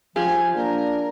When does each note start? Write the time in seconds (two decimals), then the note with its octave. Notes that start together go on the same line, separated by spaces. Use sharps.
0.16 F3 F4 G4 G#4 G#5
0.55 A#3 D4 A#4